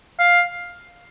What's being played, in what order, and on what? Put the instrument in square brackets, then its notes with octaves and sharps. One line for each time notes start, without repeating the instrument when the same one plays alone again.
[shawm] F5